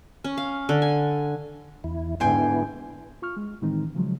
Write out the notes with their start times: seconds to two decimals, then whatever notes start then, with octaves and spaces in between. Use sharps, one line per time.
0.24 C#4
0.37 F5
0.69 D3
0.82 G#5
1.84 E2 E4
2.20 G#2 D3 B3 E4 G5 G#5 C6
3.22 F4 C#6 F6
3.37 G#3
3.62 A2 D#3 E3 G#3 C4 D#4
3.95 C#3 F3 F#3 G#3